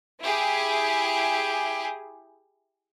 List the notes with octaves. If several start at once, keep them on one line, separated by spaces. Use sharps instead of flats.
E4 G4 G#4